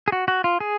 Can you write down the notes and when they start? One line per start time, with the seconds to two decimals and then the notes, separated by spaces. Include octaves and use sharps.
0.08 G#4
0.12 F#4
0.28 F#4
0.44 F4
0.60 G#4